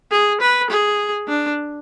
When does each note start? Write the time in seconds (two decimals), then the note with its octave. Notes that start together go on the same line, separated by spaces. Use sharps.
0.11 G#4
0.41 B4
0.70 G#4
1.28 D4